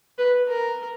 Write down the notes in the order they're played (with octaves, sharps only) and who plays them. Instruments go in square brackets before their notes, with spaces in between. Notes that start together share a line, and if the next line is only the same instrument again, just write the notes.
[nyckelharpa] B4
A#4